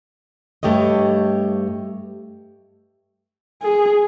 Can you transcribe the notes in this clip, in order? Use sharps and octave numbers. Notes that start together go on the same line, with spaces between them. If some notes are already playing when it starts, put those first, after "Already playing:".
G2 A3 G4 C#5 D#5
G#4